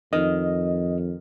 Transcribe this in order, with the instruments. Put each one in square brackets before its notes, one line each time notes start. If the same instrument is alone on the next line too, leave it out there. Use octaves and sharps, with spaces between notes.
[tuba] F2 [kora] D#3 [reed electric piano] D#5